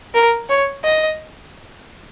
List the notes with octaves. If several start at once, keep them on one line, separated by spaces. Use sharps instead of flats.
A#4
C#5
D#5